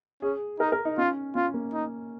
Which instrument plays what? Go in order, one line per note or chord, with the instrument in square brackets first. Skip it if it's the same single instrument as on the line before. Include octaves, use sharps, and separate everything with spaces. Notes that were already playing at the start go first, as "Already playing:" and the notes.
[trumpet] C#4 [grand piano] G#4
[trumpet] D#4 [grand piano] A#4
[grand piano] A#4
D#4
[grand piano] C#4 [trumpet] F4
[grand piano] C#4 [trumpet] F4
[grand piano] A#3
[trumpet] D#4